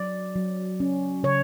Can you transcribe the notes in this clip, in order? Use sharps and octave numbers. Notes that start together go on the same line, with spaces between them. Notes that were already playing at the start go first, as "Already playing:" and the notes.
Already playing: F#3 D5
F#3
C#4
C#3 C#5